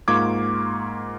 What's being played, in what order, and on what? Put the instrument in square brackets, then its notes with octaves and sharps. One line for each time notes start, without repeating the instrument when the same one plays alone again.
[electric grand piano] G#2 A#3 F4 C#6 D6 G#6